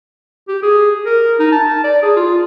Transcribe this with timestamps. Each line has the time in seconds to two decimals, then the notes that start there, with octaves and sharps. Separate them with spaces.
0.48 G4
0.62 G#4
1.06 A#4
1.39 D#4
1.52 A5
1.84 D5
2.02 G#4
2.16 F4